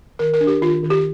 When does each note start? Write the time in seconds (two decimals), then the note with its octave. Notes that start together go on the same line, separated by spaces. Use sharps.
0.19 D#3 A#4
0.34 A#4
0.41 D4
0.47 G4
0.62 D#3 F4
0.83 D#3
0.90 G4